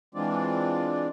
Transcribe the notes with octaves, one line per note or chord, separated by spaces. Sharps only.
E3 G#3 C4 D4 F4 D5